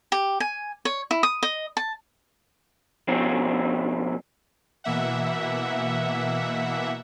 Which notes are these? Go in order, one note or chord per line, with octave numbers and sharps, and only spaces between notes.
G4
G#5
C#5
E4
D#6
D#5
A5
F2 B2 F3 C4 C#4
B2 E3 A#3 E5 F#5